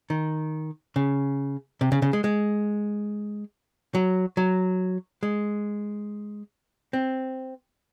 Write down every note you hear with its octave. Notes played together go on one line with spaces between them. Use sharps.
D#3
C#3
C3
C#3
C#3
G#3
G#3
F#3
F#3
G#3
C4